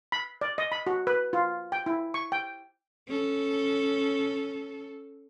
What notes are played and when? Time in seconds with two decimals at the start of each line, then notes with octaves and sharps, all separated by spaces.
0.12 B5
0.41 D5
0.58 D#5
0.72 B5
0.87 F#4
1.07 B4
1.33 F4
1.72 G5
1.86 E4
2.14 C#6
2.32 G5
3.08 C#4 A4